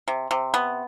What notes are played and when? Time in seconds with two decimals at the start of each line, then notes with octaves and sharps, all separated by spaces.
0.08 C3
0.31 C3
0.54 B3